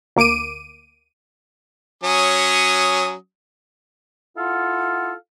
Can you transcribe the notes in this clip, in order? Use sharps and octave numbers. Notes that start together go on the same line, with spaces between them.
D2 A#3 D6 D7 D#7
F#3 C#4 D#6
E4 F4 A4 F5 F#5